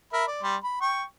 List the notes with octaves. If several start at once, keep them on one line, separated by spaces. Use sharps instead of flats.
A#4 E5 B5
D5
G3 C6
B5
G5 C#6